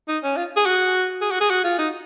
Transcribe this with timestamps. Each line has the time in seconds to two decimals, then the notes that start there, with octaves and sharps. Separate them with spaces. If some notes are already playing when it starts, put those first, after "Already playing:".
0.08 D#4
0.23 C#4
0.36 F4
0.56 G#4
0.66 F#4
1.21 G#4
1.31 F#4
1.40 G#4
1.50 F#4
1.64 F4
1.79 D#4